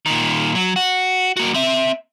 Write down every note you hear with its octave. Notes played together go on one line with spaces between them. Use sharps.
A#2 D#3
F#3
F#4
A#3 F#4
C4 E5